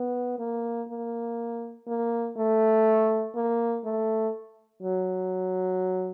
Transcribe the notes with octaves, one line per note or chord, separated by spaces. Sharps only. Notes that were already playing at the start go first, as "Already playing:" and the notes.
Already playing: B3
A#3
A#3
A#3
A3
A#3
A3
F#3